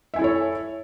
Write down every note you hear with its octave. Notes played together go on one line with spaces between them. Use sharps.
E4 A4 C#5 E5 G#5